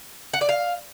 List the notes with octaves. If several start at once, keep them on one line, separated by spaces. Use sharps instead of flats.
F#5
D5
F5